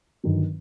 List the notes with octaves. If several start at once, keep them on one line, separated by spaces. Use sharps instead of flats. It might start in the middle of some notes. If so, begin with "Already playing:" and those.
G1 G2 D#3 F#3